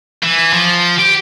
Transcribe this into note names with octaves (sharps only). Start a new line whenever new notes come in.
E3
F3
G4